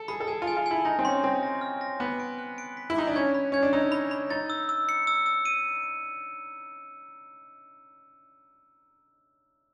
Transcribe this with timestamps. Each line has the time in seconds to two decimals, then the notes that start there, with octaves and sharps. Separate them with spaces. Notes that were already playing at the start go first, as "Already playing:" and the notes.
Already playing: A4
0.08 G#4 B5
0.20 A4
0.27 G#4 G#5
0.42 F4
0.47 G#5
0.57 F4
0.66 E4 G#5
0.85 D#4 A#6
0.99 C4
1.05 C#4 C6
1.23 C4 A#6
1.43 A#6
1.61 F6
1.81 A#6
2.00 B3 D6
2.20 D7
2.39 F#6
2.58 D7
2.77 B6
2.90 E4
2.96 D#4 D6
3.07 D4
3.16 C#4 G#6
3.34 B5
3.52 C#4 G#6
3.63 D4
3.73 D#4 E6
3.92 B5
4.11 B5
4.30 D#4 A6
4.50 E6
4.69 E6
4.89 C#7
5.07 E6
5.26 E6
5.45 D#7